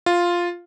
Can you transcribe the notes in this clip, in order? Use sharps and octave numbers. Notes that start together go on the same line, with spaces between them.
F4